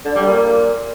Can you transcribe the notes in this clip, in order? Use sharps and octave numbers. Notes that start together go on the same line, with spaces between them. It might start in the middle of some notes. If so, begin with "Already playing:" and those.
D3
G3
A#2